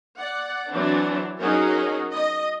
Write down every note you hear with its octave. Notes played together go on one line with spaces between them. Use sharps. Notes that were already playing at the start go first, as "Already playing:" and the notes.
D5 F#5
E3 F#3 C4 D4
F#3 C#4 D#4 G#4 A#4
D#5